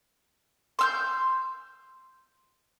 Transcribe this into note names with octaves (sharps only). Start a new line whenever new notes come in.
C6 E6 G6